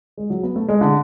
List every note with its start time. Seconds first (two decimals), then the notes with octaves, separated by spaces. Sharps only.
0.17 G#3
0.30 F#3
0.43 B3
0.56 A3
0.68 G#3
0.81 D3